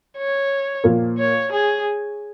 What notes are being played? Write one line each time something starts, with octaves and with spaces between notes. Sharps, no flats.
C#5
A#2 F3 A#3
C#5
G#4